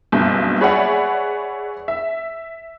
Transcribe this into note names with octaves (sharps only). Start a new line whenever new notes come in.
F#1 G2 B2
G#4 B4 C#5 D5 E5 F#5
E5